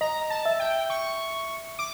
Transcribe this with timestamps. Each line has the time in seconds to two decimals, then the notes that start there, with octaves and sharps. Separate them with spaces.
0.01 D#5 A#5
0.30 A5
0.46 E5
0.60 G5
0.90 C#6
1.79 D6